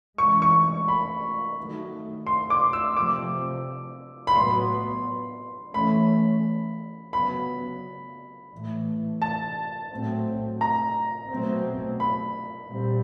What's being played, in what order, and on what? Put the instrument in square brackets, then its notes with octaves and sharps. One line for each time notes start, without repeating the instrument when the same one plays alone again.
[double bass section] E3 G#3 C#4 [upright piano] C#6
[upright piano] C#6
B5
[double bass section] D#3 F#3 A3
[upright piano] C6
D6
E6
[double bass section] C3 F3 A3 C4 [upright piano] D6
[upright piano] B5
[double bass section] A2 F#3 B3 [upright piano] C6
[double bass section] E3 A3 C#4 [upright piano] B5
[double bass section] C#3 F#3 B3 [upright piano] B5
[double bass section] A2 E3 A3
[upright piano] A5
[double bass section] A2 F#3 A3 C4
[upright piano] A#5
[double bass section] B2 F#3 A3 C4
[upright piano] B5
[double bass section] A#2 G3 C4